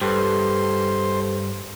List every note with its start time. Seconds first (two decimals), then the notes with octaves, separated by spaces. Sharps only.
0.01 G2 G4 A4 B4 C5